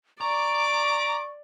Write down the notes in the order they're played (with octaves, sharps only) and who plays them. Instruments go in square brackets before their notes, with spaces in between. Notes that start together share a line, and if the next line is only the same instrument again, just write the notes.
[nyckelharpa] D5 [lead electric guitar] A#5 [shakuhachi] C#6 [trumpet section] D6